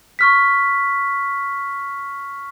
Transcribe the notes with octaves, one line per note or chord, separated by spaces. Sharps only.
C#6 F6 B6